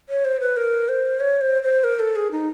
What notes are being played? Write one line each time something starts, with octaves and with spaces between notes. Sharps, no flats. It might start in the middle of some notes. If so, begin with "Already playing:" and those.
C#5
C5
B4
A#4
C5
C#5
C5
C5
A#4
A4
G#4
D#4